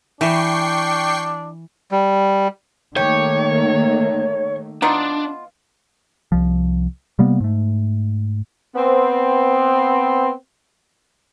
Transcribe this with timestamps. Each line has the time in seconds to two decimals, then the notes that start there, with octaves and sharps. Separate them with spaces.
0.21 E3 D4 G5 C#6 C7
1.91 G3
2.97 D#3 A3 A#3 G4 C#5
4.82 B3 D4 D#4 F4
6.32 C2 F3
7.19 C3 G3 A#3 B3
7.40 G#2 A3
8.76 B3 C4